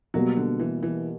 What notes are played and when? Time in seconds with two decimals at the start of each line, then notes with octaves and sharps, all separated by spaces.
0.14 B2 F#3 G3 A#3
0.37 D3
0.60 E3
0.83 E3